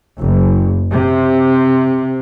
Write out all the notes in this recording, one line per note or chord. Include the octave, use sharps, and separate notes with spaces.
F#1
C3